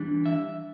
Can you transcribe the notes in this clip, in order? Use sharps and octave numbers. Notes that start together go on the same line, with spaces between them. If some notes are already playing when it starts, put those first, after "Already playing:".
Already playing: E3 G3 D4
E5